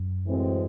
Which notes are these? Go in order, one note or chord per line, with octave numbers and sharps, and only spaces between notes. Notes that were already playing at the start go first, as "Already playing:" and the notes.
Already playing: F#2
A2 E3 G#3 C4 F#4